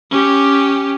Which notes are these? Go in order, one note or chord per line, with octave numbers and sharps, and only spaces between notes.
C#4 G4